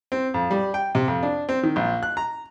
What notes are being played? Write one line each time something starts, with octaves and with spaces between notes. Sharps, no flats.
C4
F2
G3
G5
C3
F2
D4
C4
D#3
A#1
F#6
A#5